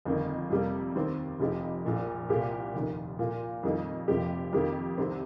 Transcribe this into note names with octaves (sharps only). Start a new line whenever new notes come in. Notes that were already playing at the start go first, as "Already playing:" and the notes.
G1 F2 D#3 A#3 D#4
F2 C3 G3 A#3
D#2 D#3 C4
F1 F2 F3 D#4 G4
A#1 A#2 A#3
C2 A#2 A#3 G4
F1 D#2 D#3
A#2 A#3 F4
F2 D#3 G3 A#3 D#4
F1 F2 F3 A#3 G4
F2 D#3 A#3 G4
C2 C3 D#3 C4